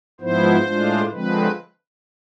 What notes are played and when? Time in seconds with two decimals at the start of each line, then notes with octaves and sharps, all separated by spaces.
0.21 G#2 F3 B3 E4 C5
0.65 A2 G#3 D4 F4
1.11 D3 F3 G#3 C4 B4